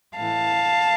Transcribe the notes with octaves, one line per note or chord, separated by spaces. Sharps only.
A2 E3 F5 A5